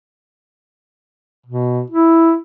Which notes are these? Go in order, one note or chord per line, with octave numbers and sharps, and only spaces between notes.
B2
E4